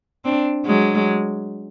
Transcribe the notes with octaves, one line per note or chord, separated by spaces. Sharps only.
C4 D4
F#3 G#3